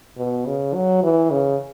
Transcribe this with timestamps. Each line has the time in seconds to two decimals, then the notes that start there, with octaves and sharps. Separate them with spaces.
0.17 B2
0.46 C#3
0.74 F#3
1.03 E3
1.31 C#3